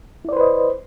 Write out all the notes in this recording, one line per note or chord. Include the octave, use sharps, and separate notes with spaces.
E4 B4 C5 D5 D#5